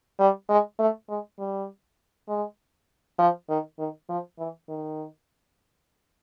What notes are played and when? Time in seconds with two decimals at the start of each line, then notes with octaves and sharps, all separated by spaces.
0.19 G3
0.49 G#3
0.79 A3
1.09 G#3
1.39 G3
2.29 G#3
3.19 F3
3.49 D#3
3.79 D#3
4.09 F3
4.39 E3
4.69 D#3